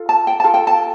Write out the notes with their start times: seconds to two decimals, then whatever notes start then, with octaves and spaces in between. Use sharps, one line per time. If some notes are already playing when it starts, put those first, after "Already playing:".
Already playing: F4 A4
0.09 A5
0.27 G5
0.40 F4 A4 A5
0.54 G5
0.67 A5